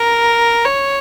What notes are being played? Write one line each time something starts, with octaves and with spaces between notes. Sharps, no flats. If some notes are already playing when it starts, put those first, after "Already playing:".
Already playing: A#4
C#5